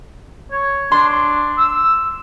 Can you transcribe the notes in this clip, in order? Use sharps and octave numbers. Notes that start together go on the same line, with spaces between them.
C#5
D4 C6
E6